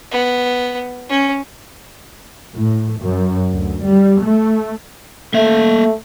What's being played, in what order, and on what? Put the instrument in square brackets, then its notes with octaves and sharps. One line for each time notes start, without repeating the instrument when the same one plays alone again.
[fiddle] B3
C#4
[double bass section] A2
F#2
D2
G3
A3
[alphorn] A3 [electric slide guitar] A#3 E5